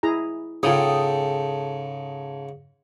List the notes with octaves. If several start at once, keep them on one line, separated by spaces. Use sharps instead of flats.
E4 G#4 A#5
G#2 C#3 F4 G#4 A4 G5 D#6